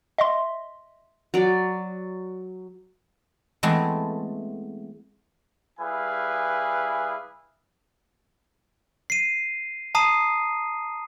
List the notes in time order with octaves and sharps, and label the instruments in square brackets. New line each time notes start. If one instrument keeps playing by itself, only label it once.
[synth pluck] D#5 E5 C6
[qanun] F#3 D5
[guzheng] E3 G#3 A3 B3 C4
[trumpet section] G3 E4 G#4 B4 F5 G#5
[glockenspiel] C7 D#7
A5 A#5 D#6 C7 D#7